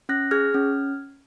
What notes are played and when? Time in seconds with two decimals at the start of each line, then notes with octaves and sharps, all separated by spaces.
0.09 C#4 F#6 A#6
0.31 G#4 F6 G#6
0.54 C#4